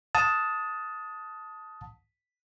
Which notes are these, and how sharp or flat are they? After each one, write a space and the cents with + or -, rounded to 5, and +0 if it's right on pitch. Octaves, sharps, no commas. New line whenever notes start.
F#5 -45 A5 +0 D#6 +15